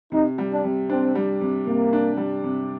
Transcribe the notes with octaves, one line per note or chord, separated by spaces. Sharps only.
C3 D#4
G3
D4
C3
C4 D4
G3
C3
C3 A#3
D4
G3
C3